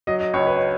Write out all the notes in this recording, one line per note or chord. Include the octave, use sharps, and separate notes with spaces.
F#3 D#5
D#5
C#2 C#5
B4
C#5